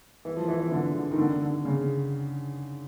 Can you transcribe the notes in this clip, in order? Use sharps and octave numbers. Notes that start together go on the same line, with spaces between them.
E3
F3
E3
E3
D3
D3
D#3
D3
D3
C#3